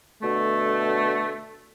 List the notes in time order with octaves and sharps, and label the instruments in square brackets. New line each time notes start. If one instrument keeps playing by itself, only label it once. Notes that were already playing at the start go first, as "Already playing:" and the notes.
[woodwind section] B2 D3 A3